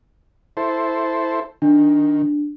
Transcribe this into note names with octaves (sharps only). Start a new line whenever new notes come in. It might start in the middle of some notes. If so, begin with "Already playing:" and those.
E4 A4 C5
D#3 D4